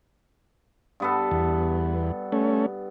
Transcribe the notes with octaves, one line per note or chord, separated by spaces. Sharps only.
G2 B3 A4
E2
A3 C#4